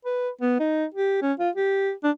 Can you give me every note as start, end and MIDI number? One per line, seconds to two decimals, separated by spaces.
0.05 0.29 71
0.41 0.55 59
0.60 0.85 63
0.94 1.18 67
1.22 1.33 61
1.39 1.50 65
1.56 1.92 67
2.04 2.11 62